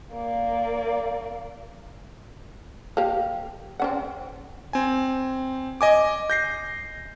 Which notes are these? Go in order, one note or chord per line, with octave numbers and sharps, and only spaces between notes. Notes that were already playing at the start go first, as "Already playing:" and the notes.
A#3 D5
A#3 G4 F5
C4 C#4 F#5
C4 G#5
D#5 G#5 D6
G6 A#6 C7